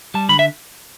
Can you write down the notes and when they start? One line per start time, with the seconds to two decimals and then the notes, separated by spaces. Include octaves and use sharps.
0.14 G3 A5
0.29 D3 B5
0.39 E5